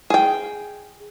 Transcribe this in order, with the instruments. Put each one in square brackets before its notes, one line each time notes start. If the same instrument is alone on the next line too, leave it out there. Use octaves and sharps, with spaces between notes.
[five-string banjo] G#4 G5